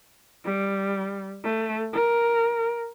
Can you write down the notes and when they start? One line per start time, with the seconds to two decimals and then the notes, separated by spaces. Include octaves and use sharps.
0.44 G3
1.44 A3
1.93 A#4